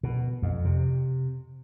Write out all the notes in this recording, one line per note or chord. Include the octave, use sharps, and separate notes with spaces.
B2
F2
C3